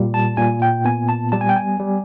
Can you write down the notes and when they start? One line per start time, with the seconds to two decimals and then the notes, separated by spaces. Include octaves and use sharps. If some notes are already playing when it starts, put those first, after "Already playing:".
Already playing: A#2 G3
0.14 A5
0.37 A#2 G#5
0.62 G5
0.85 B3 G#5
1.09 A5
1.32 G3 A5
1.41 G#5
1.49 G5
1.56 G#5
1.80 G3